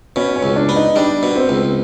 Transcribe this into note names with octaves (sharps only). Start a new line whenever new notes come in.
B2 C#4
C#4
C#2
D4
B3
D#4
G3 D4
B2
C4
C#2